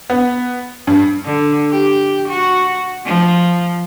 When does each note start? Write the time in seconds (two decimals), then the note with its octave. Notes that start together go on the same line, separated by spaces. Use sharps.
0.10 B3
0.87 G2
1.25 D3
1.71 G4
2.28 F#4
3.05 F3